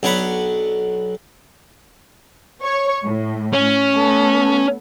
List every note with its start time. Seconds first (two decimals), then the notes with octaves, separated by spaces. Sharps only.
0.03 B1 D4 C#5 F#5 B5
2.62 C#5 C#6
3.05 A2
3.53 C#4
3.95 A3 B3 A4